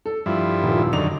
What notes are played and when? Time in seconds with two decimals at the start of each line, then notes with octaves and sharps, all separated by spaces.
0.06 A4
0.26 G2 F3 E4
0.63 D#1
0.93 F#2 D3 D#3 F7